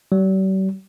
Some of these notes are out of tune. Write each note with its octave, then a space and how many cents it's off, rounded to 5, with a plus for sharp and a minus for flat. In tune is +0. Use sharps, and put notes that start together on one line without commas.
G3 -45